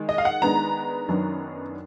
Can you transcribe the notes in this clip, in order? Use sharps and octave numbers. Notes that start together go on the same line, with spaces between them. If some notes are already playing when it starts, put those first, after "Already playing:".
Already playing: D#3 G#3
D#5
F5
F#5
D#3 G#3 B3 D4 A#5
F#2 D#3 F#3 B3 D4